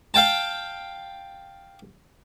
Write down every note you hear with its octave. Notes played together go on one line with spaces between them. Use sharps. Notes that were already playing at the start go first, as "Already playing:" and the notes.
F5 G5 A5